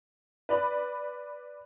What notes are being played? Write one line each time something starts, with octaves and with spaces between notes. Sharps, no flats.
B4 D5 B5